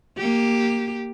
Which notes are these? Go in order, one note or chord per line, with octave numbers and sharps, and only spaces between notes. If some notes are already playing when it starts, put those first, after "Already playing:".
A#3 G4